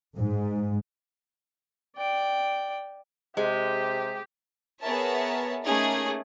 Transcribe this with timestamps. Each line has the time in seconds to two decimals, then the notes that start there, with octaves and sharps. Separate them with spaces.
0.16 G#2
1.96 D5 G5
3.37 C3 G#3 G4
4.82 B3 G#4 A#4 C#5 E5 A5
5.64 A3 A#3 C#4 D#4 G#4